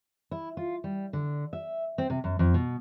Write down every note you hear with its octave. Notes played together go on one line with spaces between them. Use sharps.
E4
F4
G3
D3
E5
C4
C3
F#2
F2
B2